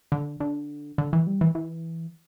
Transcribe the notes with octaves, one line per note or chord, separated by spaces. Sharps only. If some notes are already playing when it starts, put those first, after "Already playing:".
D3
D3
D3
E3
G3
E3
E3